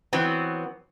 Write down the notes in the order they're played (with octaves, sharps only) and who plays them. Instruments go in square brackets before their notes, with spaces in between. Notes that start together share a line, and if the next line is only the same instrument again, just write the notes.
[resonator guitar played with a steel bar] E3 F#3 B3 C4